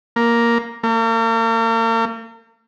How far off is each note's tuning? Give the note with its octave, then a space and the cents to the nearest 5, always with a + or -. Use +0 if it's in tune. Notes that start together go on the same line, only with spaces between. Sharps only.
A#3 +5
A#3 -40